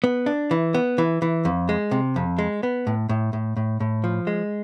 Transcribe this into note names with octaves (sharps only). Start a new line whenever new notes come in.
B3
D4
E3
B3
E3
E3
F2
G#3
C3
F2
G#3
B3
A2
A2
A2
A2
A2
F3
G#3